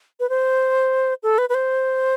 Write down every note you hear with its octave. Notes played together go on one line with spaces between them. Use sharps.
B4
C5
A4
B4
B4
C5